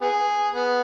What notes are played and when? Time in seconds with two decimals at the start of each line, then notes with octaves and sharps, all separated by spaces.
0.01 B3 G#4
0.54 B3